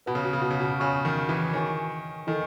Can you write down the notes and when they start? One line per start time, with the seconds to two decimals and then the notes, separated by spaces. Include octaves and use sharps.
0.06 B2 B4 F#5 B5
0.15 C#3
0.24 B2
0.33 C#3
0.42 B2
0.50 C#3
0.60 B2
0.80 C#3 C#5 G#5 C#6
1.05 D#3
1.29 E3
1.53 D#3 C#5 G#5 C#6
2.27 D#3 E4 A4 D#5 G#5